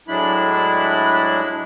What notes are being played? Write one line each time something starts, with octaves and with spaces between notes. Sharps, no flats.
A2 F#3 G#3 D4 E4 B5